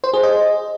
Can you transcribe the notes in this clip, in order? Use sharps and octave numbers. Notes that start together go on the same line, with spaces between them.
C5
G#4
D#5